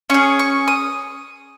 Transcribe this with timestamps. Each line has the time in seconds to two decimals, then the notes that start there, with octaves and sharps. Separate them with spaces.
0.10 C#4 C#6
0.14 G#4
0.39 C#6
0.68 D#6